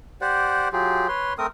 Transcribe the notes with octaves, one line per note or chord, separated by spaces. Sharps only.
G4 C5 D5 F#5
F#3 F4 G4 G#4
B4 C#5 C6
A3 C4 A#4 D#6